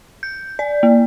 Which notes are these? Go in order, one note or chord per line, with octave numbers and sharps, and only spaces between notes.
G6
D5
A#3